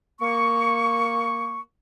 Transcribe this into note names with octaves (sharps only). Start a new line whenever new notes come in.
A#3 C#6